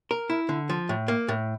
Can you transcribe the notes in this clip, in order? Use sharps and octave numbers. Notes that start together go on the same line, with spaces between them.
A#4
E4
D3
F3
A2
A#3
A2